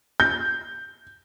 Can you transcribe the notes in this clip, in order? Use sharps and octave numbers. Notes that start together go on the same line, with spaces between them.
G6